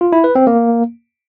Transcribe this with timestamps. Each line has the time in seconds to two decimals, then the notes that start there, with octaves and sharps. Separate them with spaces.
0.01 F4
0.12 E4
0.24 B4
0.35 C4
0.47 A#3